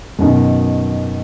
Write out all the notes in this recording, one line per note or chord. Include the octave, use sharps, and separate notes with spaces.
F#2 B2 D#3